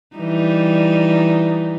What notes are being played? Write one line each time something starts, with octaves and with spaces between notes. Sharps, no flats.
E3 G3 D#4